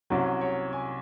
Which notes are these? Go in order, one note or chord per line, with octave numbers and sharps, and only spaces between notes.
C2 C3 F#3 C#4 C#5
C#5
G#5